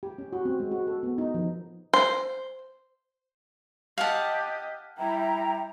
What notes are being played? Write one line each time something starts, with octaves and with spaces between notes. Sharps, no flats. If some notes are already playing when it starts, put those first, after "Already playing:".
G4
C#4
F#4
C4
G#3
F#4
A4
B3
D#4
F3
C5
G4 D#5 F5 F#5 A5
G3 E4 E5 G5 A#5